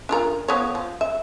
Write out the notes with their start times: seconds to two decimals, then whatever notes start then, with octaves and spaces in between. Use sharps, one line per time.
0.09 D4 F4 A#4
0.48 F3 B3 C#5
0.75 F3
1.01 E5